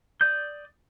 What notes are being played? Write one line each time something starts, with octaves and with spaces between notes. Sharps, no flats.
D5 D#6 G6